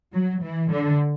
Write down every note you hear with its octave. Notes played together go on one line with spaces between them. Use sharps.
F#3
E3
D3